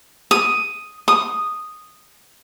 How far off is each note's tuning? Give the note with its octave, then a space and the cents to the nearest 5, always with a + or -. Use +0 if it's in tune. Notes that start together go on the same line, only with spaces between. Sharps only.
D#6 +5
D#6 -5